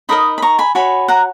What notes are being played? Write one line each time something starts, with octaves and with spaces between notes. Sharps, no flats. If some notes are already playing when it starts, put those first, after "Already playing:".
D#4 A#4 D#5 B5 D#6
B5
A#5 C#6
G#5 B5
F#4 C#5 G#5 B5
F#5 A#5